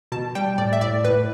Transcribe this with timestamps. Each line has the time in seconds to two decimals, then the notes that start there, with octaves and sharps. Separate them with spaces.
0.12 B2 A5
0.35 G3 G5
0.58 A2 D5
0.73 E5
0.81 A2 D5
1.04 A2 B4